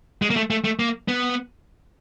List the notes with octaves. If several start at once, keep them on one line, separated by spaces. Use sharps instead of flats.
G#3
A#3
A3
A3
A3
A#3
B3